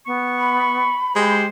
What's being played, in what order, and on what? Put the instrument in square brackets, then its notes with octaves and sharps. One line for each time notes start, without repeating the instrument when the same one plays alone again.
[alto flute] B3 [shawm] C#6
[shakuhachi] B5
[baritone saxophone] G#3 [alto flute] G4 [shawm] C5